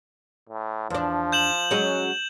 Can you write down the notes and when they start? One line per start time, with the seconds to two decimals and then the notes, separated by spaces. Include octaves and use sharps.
0.50 A2
0.90 E2 F3 D4
1.32 G6 E7 F#7
1.71 F#3 G#3 C#4